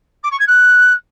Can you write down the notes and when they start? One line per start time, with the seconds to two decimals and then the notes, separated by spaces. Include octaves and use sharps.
0.23 D6
0.31 C#6
0.39 G#6
0.47 F#6